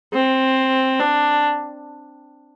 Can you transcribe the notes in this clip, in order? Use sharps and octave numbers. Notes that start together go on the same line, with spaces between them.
C4
D4